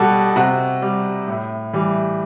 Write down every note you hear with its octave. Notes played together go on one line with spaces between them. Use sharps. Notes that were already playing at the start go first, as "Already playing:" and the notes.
Already playing: B2 G3 F#4 A4
C3 F#4
G3
A2
E3 G3